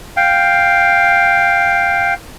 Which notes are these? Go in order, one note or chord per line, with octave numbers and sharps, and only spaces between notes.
F5 G5